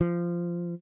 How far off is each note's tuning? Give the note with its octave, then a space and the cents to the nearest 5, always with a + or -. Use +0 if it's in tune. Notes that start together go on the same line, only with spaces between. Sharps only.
F3 -15